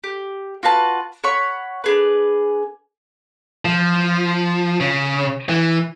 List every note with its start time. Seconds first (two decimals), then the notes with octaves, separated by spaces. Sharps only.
0.04 G4
0.63 F4 F#4 B4 A5
1.24 C#5 F#5 B5 C#6
1.84 D4 G#4 B4
3.65 F3
4.81 C#3
5.49 E3